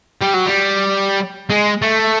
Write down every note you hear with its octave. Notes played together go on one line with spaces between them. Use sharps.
G3
F#3
G3
G#3
A3